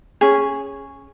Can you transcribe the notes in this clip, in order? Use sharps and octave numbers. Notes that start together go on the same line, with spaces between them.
C#4 G#4